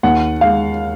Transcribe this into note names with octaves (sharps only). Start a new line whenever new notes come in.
D#2 F#5
G#3 F5